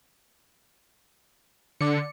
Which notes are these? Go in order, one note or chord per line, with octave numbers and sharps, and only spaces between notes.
D3 D5 C#7